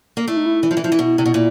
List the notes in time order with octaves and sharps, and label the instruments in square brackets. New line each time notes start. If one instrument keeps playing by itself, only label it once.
[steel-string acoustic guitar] A#3
[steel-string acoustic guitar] A3 [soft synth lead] E4
[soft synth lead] D#4
E4
[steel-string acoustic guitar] E3
F3
E3
F3
E3
B2
C3
B2
A#2